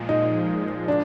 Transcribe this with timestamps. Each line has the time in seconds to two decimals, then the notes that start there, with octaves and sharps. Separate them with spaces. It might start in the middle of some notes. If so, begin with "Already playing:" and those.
Already playing: A#2 F3 G#3
0.09 D#4
0.88 D4